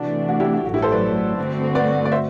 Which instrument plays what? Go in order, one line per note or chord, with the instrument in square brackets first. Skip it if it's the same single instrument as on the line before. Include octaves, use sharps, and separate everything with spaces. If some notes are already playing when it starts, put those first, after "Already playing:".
Already playing: [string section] C3 E3 A3 D4 [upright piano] F#4
[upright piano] F#4
E4 G4
F#4
[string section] A1 G2 F#3 A3 [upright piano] F#4
[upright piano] E4 G4
A4 C5
B4 D5
[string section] G2 D3 A3 C4 F#4
[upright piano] B4 D5
D5
C5 E5